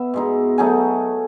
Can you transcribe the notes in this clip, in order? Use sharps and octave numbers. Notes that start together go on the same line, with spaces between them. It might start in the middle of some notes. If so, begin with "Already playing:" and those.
Already playing: B3 E5
B2 G#3 D#4
F#3 A3 D#4 G#5